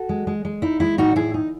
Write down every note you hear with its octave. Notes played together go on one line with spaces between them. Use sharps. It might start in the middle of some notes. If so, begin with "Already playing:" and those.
Already playing: F#4 A4
G#3
G#3
G#3
D#4 E4
G#3 E4
A2 D#4 F#4
A2 E4 G#4
D#4